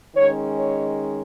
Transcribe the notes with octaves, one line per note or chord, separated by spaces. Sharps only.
D#3 G#3 C#4 C#5
C#5